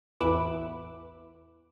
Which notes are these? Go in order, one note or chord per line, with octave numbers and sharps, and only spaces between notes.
A1 E2 B3 E4 B4 D6